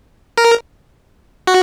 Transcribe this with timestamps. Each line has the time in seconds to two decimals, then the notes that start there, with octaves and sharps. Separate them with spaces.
0.38 A#4
1.47 F#4